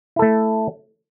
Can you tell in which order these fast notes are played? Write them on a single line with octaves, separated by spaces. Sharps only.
E4 A4 A3